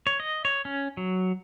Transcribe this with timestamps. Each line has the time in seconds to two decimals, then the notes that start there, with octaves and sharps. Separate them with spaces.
0.07 C#5
0.20 D#5
0.45 C#5
0.65 C#4
0.97 F#3